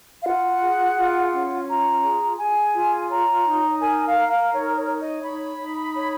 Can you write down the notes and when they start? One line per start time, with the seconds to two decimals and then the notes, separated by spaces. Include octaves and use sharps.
0.22 F5
0.26 F4 F#5
0.61 G#4
0.97 F4
1.32 C#4
1.68 F4 A#5
2.03 G#4
2.38 G#4 G#5
2.74 F4
3.10 C#5 A#5
3.46 D#4
3.81 A#4 G#5
4.05 F5
4.16 A#4
4.29 F5
4.52 D#4 C#5
4.76 C#5
4.87 C#5
4.99 D#5
5.22 D#4 B5
5.58 D#4
5.94 C#5